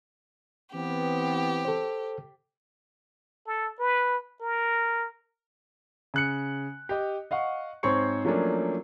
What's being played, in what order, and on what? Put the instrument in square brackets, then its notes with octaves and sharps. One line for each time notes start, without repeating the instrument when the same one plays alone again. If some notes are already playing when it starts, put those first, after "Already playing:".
[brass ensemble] E3 B3 C4 [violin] G4
[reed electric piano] A4 C5
[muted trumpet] A4
B4
A#4
[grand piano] C#3 F#6 C#7
G4 D#5
D#5 F5 F#5 C#6
G#2 C4 C5 C#5 C#6 C#7
F3 F#3 A3 A#3 C#4 D4